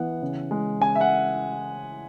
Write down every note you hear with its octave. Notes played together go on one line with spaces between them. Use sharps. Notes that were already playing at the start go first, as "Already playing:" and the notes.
Already playing: E3 B3 F#5
C#3
G#3
C#3 G#5
E5
F#5